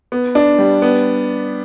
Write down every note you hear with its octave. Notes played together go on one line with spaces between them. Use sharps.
B3
D4
G3
B3